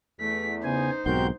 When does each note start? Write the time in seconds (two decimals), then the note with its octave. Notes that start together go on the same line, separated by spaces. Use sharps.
0.20 E2 A3 B6
0.64 C#3 B3 D#4 C5 G#5
1.06 B1 G#2 C4 F#4 G4 A#4 C6 G6